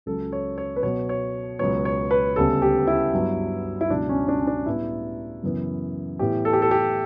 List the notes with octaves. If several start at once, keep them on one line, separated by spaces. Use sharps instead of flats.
C#2 C#3 F#3 A4
C#5
C#5
B4
B2 F#3 B3 C#5
C#5
C#2 B2 F#3 B3 C#5
C#5
B4
D2 C#3 G3 B3 A4
G4
E4
G2 F#3 B3
E4
C#2 B2 F#3 D4
C#4
D4
C#4
D4
A2 G3 B3 E4
F#2 C#3 E3 B3
A2 E3 B3 G4
A4
G4
A4
G4